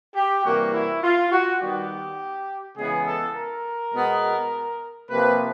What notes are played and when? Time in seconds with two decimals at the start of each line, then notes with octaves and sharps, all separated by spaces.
0.15 G4
0.44 C3 E3 G3 A#3 F#4
0.73 E4
1.02 F4
1.31 F#4
1.60 D#3 G3 B3 G4
2.77 C#3 E3 G#3 B3 G#4
3.06 A4
3.35 A#4
3.93 B2 G#3 B3
5.10 C3 F3 A#3 B4